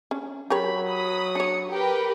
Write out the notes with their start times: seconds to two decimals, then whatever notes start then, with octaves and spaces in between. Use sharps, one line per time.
0.11 C#4 D4
0.50 F#3 G4 A#4 C#5 B5
0.87 B5 D#6
1.35 D4 C#5 C#7
1.71 G4 A#4 B4 G5